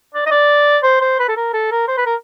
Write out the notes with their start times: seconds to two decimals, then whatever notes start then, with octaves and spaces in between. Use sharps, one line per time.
0.14 D5
0.26 D#5
0.31 D5
0.83 C5
1.01 C5
1.19 B4
1.28 A4
1.36 A#4
1.53 A4
1.71 A#4
1.88 C5
1.97 B4
2.06 A#4